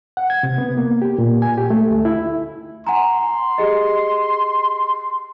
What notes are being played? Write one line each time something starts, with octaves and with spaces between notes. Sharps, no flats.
F#5
G#6
C3
B3
A#3
G4
A#2
G#5
G4
A3
D2
E4
F#5 G#5 A#5 C6
G4 G#4 D#5